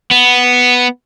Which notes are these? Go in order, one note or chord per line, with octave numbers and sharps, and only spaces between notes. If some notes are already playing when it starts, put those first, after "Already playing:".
B3